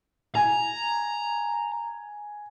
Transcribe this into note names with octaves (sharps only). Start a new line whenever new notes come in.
G#5 A#5